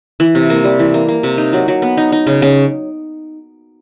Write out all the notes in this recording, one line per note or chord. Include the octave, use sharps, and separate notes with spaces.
E3
C3
A#3
G3
E3
A#3
A#3
C3
D#4
F#3
F#3
B3
D#4
D#4
C#3
C#3